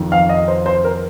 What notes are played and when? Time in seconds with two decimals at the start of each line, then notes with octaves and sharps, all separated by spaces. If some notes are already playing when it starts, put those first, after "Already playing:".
Already playing: F2 D#3
0.12 F5
0.29 D#5
0.48 C5
0.66 C5
0.84 A#4